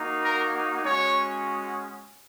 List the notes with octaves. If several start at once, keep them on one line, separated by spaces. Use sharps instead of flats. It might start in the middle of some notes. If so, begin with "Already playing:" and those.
Already playing: A#3 D#4 F#4
A#4
G#3 C#4 F#4 C#5